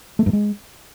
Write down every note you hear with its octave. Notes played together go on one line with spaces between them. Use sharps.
A3
G2
G#3